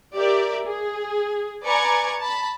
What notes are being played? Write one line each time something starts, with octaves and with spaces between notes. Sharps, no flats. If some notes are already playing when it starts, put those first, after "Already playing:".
G4 A#4 D5 E5
G#4
B4 D5 G#5 A#5 C#6 G#6
A5 B5